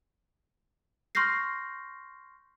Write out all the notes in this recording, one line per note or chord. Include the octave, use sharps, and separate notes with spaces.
C6 C#6 F6 G6 A#6 C7